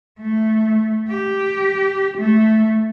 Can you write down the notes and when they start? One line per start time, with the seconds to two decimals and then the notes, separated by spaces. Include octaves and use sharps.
0.20 A3
1.08 G4
2.18 A3